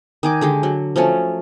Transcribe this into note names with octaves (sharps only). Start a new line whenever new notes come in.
D#3 G#5 D6
D3 G#3 G4
F#3
F3 F#3 A3 C#4